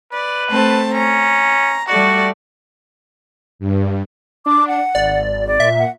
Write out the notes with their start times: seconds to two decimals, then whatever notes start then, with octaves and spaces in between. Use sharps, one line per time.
0.12 B4 D5
0.50 A3 C4 A5
0.94 C#4 A#5
1.88 G3 A3 F#4 D5
3.59 G2
4.46 D4 D6
4.68 F#5
4.95 G#1 D5
5.46 D5
5.60 A#2 E5
5.79 F#5